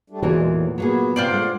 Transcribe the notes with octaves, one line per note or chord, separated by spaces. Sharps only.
G3 A3 D4
E2 A#2 E3 G#3 F#4
A2
F#3 A#3 B3 G#4
C3 F4 C5 D5
G#3 A3 D4 F#5